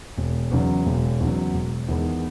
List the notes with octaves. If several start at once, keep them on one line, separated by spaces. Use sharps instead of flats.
E1
E2 C#3 F#3
E1
E2 C#3 F#3
E1
E2 D#3 G#3 B3